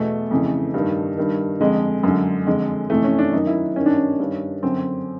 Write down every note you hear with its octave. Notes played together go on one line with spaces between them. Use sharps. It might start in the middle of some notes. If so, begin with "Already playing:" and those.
Already playing: E2 B2 A3
F2 C#3 E3
G2 D#3
G2 D#3
F2 D3 G#3
F#2 D3
F2 D3 G#3
F2 C3 E3 A3
C#4
D4
F#2 D#3 D#4
E4
G2 D#3 C#4
D4
C#4
G2 D#3
F#2 D3 C4